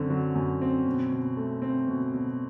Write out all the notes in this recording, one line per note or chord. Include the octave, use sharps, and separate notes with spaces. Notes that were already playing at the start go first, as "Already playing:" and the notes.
Already playing: F#2 D3 C4
F#3
F#2
C4
B2
B2
A3
C4
B2
B2